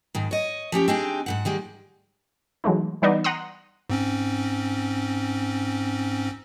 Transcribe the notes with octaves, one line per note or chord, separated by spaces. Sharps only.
G#2 D#3
C#5 D#5
F3 C#4 G4 C#5
C4 D4 D#4 G4 G#4
G#2 C#3 F#5
D#3 G3 G#3
E3 F#3 G#3 A3 D#4
E3 G3 B3 D#4 D5 D#5
F#5 A#5 C6 D#6
G#2 C4 C#4